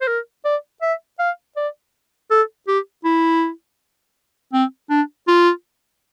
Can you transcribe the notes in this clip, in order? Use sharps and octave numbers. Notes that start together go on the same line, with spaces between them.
C5
A#4
D5
E5
F5
D5
A4
G4
E4
C4
D4
F4